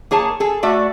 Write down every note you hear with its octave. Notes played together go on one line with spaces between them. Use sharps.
A#3 G#4 C#5 A5
G#4 A4
A3 F#4 D5 E5